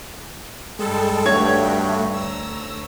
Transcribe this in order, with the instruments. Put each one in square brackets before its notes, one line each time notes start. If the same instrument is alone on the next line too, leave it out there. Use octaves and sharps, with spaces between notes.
[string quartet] G2 G3 G5 [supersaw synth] G#3 A4
[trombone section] G2 [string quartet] D#3 F#4 G5 [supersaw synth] A3 [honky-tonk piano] C#5 G#6
[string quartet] D2 A#5 [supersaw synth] E6